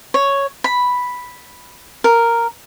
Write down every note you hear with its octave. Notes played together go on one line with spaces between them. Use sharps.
C#5
B5
A#4